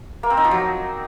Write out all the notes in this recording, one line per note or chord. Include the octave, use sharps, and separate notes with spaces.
A#3
C4
D#4
F3
F#3